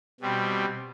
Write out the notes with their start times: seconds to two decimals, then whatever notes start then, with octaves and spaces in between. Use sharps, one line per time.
0.20 B2 G3 C4